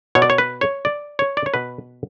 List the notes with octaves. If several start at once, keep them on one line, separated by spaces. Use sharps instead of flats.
B2 C#5
D5
C#5
B4
C#5
D5
C#5
D5
C#5
B2 B4